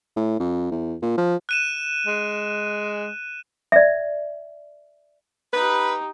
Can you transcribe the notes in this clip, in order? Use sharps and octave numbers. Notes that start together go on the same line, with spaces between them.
A2
F2
E2
A#2
F3
F#6 D#7 E7
G#3
D5 E5
D#4 G4 B4